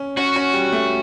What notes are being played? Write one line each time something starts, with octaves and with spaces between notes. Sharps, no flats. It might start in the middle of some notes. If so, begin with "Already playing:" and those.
Already playing: C#4
C#4 F#4
C#4
G3
A3